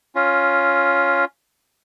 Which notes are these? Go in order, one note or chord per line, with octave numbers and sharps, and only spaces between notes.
C#4 F4